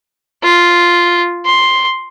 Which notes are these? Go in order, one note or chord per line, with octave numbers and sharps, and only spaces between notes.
F4
C6